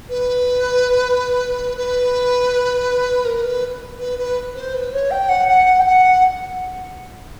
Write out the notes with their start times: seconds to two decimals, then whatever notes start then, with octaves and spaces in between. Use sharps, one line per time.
0.09 B4
1.77 B4
3.25 A#4
3.44 B4
3.99 B4
4.19 B4
4.55 C5
4.74 B4
4.93 C#5
5.11 G5
5.29 F#5
5.48 F#5
5.80 G5
5.85 F#5